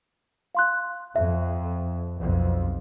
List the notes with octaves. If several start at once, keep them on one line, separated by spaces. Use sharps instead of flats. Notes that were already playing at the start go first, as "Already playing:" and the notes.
F5 C6 F#6
F2 E5
B1 F2